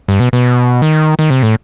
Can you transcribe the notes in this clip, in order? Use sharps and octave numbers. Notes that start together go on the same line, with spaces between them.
G2
B2
B2
D#3
D#3
C3
A2